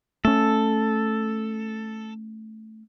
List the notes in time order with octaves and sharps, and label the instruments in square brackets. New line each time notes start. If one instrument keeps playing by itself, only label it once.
[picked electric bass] A3 C#4 [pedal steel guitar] A4